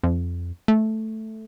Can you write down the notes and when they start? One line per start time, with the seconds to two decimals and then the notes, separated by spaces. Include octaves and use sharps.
0.04 F2
0.68 A3